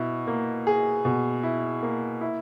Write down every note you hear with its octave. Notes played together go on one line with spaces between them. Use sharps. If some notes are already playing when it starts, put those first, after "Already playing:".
Already playing: B2 E4
A#3
G#4
B2
E4
A#3
E4